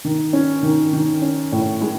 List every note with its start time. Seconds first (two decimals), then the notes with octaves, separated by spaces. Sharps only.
0.05 D#3
0.33 C#4
0.63 D#3
0.93 D#3
1.22 C#4
1.52 A2
1.81 G#3